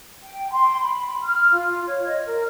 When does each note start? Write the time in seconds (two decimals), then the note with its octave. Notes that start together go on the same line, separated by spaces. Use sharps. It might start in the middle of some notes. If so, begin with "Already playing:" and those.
0.23 G5
0.52 C6
0.82 B5
1.23 F6
1.51 F4
1.86 C#5
2.06 D#5
2.25 A#4